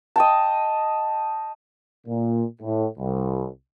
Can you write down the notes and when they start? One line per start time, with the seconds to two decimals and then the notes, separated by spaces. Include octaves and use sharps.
0.16 D#5 G5 A5
2.07 A#2
2.62 A2
2.98 C2